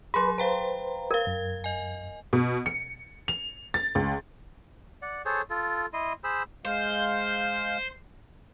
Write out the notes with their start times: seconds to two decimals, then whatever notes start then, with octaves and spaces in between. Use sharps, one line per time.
0.14 F#3 G#4 B4 B5 C6
0.38 B4 C5 F5 G5 A#5
1.11 A#4 F5 G#6
1.27 F#2
1.64 D#5 G#5
2.33 B2
2.66 C#7
3.28 F7
3.74 A6
3.95 C#2
5.02 D5 F#5
5.25 G#4 A4 C5 C#5
5.50 F4 A4
5.93 E4 D#5 C6
6.24 G#4 C5 B5 E6
6.65 G#3 C5 F5 G6